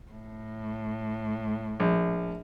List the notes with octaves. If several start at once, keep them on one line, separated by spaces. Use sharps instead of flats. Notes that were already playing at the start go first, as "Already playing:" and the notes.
A2
A#1